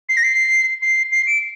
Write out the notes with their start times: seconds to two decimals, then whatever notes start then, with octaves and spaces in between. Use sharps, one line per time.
0.09 C7
0.17 A#6
0.23 C7
0.82 C7
1.12 C7
1.27 D7